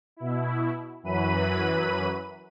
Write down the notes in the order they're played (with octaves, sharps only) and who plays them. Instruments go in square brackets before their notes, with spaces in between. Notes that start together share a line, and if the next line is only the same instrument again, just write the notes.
[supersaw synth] B2 E4
F#2 E3 F#3 B4 B5 D#7